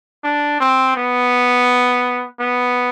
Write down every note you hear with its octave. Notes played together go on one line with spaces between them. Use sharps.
D4
C4
B3
B3